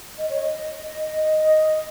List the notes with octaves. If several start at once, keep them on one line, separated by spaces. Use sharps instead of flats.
D#5
C#5
D#5